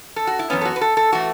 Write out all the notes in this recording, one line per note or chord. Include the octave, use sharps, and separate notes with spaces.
A4
F#4
E4
F#2 E3 B3 C#4
A4
F#4
B4
A4
A4
E3 A3 F#4